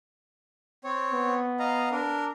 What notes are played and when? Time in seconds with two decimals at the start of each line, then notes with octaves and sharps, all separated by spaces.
0.84 C4 C#5
1.13 B3
1.59 D#5 F5 A#5
1.92 D4 A#4